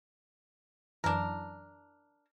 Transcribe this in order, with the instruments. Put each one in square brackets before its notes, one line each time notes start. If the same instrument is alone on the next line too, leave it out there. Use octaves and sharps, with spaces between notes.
[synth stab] F#2 E3 [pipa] D4 A#4